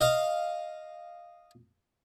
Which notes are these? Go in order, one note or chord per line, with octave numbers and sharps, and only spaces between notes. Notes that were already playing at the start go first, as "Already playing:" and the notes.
D#5 F5